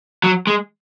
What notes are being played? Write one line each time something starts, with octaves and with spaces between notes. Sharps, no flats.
F#3
G#3